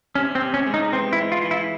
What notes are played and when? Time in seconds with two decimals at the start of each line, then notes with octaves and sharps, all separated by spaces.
0.15 C3 C#4
0.35 C4
0.41 C3
0.54 C#4
0.66 G#3
0.74 D#4
0.92 E3 C4
1.13 E4
1.19 G#3
1.32 F4
1.44 E3
1.51 E4